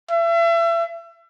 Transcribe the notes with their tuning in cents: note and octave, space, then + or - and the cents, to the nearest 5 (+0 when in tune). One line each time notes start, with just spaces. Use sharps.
E5 +35